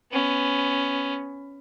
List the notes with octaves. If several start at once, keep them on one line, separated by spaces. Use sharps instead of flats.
B3 C#4